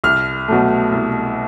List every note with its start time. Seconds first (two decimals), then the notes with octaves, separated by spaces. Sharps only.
0.04 C2 F6
0.48 B2 F#3 A3
0.92 C2